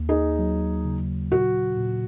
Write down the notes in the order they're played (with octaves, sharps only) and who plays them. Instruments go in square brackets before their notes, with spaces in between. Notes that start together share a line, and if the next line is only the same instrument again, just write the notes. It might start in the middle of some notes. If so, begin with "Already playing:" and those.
Already playing: [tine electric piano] D#2 A#3
[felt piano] D#4 G#4
[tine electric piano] F#3
C#3
[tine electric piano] A#2 [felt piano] F#4
[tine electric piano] A#2